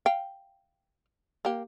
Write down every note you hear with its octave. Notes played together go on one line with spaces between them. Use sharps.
F5 G5
A#3 G4